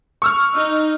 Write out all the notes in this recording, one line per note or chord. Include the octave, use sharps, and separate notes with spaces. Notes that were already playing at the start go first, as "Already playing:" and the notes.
C#6 E6 F6
D#4